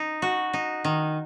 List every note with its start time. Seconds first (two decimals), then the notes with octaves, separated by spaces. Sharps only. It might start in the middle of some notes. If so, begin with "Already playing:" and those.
Already playing: D#4
0.22 F#4
0.53 D#4
0.85 D#3